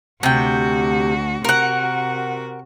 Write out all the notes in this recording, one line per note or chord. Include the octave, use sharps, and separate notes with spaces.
D2 C3 F#4 G5
C3 F#4 A#4 F#5